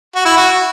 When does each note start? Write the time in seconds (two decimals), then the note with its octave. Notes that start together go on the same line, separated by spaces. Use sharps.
0.16 F#4
0.25 E4
0.37 F#4